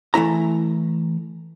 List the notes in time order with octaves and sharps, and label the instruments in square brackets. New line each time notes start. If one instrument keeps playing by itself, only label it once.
[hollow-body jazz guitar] E3 A3 E4 A#5